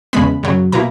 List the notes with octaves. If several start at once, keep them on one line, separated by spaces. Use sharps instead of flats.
E2 C#3 G#3 B3 B5
F#2 C#3 F#3
B2 A#3 E4 A#5